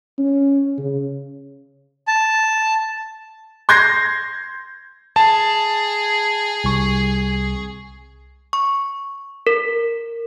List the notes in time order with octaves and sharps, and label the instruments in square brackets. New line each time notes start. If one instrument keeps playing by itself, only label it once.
[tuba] C#4
C#3
[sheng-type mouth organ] A5
[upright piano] C6 G6 G#6 A#6 C7
[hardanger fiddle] G#4 [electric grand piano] A5
[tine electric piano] C2 C#6
[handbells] C#6
A#4